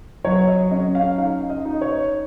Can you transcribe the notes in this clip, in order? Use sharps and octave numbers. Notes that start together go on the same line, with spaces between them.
F#3 C#5
D#5
C#4 D#5
F5
D#4 F5
D#5
D#4
C#5